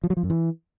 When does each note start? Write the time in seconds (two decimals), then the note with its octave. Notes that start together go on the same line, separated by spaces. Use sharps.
0.04 F3
0.10 F#3
0.17 F3
0.23 F#2
0.30 E3